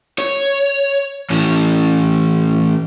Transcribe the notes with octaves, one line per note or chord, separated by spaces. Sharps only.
C#5
A2 E3